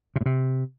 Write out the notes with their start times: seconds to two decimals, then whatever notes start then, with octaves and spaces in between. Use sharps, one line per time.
0.16 C3
0.21 A2
0.26 C3